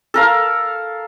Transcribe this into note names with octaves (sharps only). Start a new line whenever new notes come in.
A4 A#4 F5